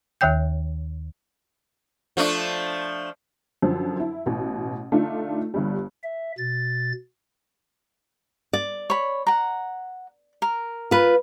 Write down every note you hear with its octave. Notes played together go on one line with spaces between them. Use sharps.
D#2 D#3 C#5 G5 G6
F3 A3 D4
F#2 D3 F3
E4
A1 B2
D3 A3 D4 D#4 F4
G1 G2 G3
E5
B2 A6
D5
C#5 B5
F#5 A#5
A#4
F4 B4